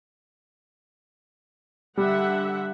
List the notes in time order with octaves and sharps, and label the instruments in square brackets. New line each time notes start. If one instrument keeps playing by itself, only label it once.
[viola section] D3 E5 F#5 [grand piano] G3